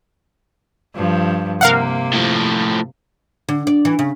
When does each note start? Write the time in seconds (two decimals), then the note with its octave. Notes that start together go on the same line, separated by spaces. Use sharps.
0.96 G2 F3
1.61 C3 A#3 A#4 F5 F#5
2.13 A2 F3
3.49 D3
3.67 D5
3.85 E3
3.99 C#3